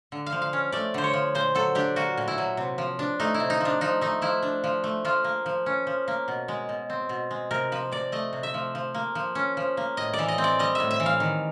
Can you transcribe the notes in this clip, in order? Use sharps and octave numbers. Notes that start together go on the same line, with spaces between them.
D3
F5
F3
F5
C#4
A3 D5
D3 C5
C#5
F3
A#2 C5
F#3 A4
D4 G4
A#3 F#4
A#2
E4
F#3
C3
F3
D4
A3 D#4
E4
C3
D#4
F3 D4
F3 D#4
A3 D#4
F3 E4
D4
F3
A3
F3 F4
A#3
F3
C#4
F3
A#3
B2
G#3
B2
C4
B2
G#3
C3 A#4
F3 B4
C3 D5
A3 D#5
C3
E5
F3
F3
A#3
F3
C#4
F3
A#3
A2 D#5
D5
E3
D#5
C4
D5
G3 D#5
A2 E5
E5
E3
F5
D#3